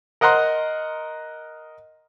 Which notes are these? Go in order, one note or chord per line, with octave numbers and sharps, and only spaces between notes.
A#4 D#5 F#5 A#5 C6